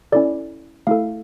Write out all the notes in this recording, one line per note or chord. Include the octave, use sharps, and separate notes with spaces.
C#4 E4 A4 D5
A3 E4 A4 F5